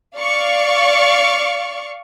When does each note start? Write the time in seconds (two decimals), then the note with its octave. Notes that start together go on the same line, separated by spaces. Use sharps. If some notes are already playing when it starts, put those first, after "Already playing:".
0.17 D5 F5 C#6